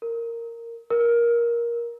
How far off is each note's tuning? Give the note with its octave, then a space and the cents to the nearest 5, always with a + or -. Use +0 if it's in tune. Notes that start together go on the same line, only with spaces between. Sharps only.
A#4 -10
A#4 +15